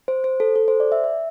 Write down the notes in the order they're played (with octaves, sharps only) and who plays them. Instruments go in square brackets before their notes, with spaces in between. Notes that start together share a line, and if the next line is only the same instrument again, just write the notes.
[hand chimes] C5
C5
A4
A4
C5
D5
E5
E5